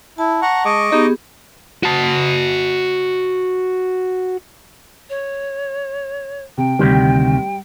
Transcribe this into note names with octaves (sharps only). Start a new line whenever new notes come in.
E4 A5
F#5 A#5 C#6
G#3 D#5 C#6 D6
B3 D#4 G4 G#4
F#4 A5
C#5
C3 G5
D2 C3 D#3 G3